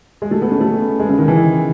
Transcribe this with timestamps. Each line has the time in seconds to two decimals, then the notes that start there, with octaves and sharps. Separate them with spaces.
0.22 G#3
0.31 A3
0.42 B3
0.51 C#4
0.61 A3
1.00 G#3
1.09 C#3
1.19 D#3
1.28 E3